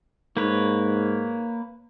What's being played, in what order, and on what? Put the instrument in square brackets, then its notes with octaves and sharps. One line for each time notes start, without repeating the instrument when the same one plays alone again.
[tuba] G#2 [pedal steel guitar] A#3 B4 C#5